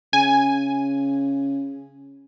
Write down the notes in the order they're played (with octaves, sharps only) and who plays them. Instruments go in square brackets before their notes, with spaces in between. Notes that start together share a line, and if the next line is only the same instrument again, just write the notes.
[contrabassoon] C#3 [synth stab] G#5